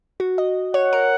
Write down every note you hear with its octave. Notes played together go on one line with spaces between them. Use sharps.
F#4
D#5
C#5 F#5
A#4